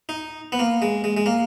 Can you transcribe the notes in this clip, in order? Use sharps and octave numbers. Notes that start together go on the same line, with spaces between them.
D#4
B3
A#3
G#3
G#3
G#3
A#3